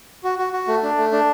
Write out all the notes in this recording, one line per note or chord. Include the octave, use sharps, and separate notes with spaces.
F#4
F#4
F#4
A3
D4
A3
D4